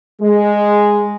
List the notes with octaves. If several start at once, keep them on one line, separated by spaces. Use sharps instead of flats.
G#3